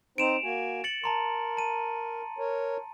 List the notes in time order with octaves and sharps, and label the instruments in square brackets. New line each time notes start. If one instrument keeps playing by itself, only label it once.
[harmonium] C4 D#4 C5 [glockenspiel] D7 E7 F7
[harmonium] A#3 F#4 G#5
[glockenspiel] A6 C#7 F#7
[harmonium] A#4 [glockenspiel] A5 A#5 C6
[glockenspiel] A5 D#7
[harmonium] A#4 C#5